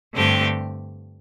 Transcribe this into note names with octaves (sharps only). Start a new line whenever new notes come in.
G2 D3 A3 C4 G4